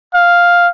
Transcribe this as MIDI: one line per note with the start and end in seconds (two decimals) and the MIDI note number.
0.14 0.68 77